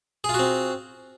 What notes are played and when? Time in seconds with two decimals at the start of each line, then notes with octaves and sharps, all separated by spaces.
0.24 G#4
0.29 F4
0.34 F#4
0.39 C4